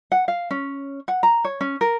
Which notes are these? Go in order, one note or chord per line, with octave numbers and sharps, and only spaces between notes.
F#5
F5
C#4
F#5
A#5
C#5
C#4
A#4